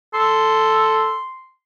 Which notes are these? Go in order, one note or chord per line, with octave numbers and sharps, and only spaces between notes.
A4 C6